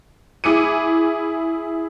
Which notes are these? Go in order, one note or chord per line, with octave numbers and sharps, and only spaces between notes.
E4 G#4 D6 C#7 D#7